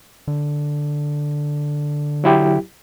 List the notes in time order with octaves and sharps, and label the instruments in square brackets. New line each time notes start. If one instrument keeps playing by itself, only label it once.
[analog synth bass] D3
[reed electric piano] F#3 E4 G4